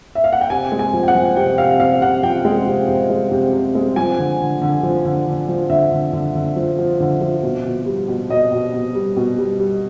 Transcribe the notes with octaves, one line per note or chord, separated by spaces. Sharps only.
E5
F5
F#5
G5
C3 G#5
G#3
G#5
F3
G5
F#5
F3
C3 G5
C3 F5
C3 F5
C3 F#5
F3 G5
G#3
C3
C3
G#3
C3
C3
G#3
F3 G#5
D3
D3
D3
F3
D3
D3
F3
D3 E5
D3
D3
D3
F3
F3
D3
F3
B2
B2
G3
B2
B2 D#5
B2
B2
G3
B2
G3
G3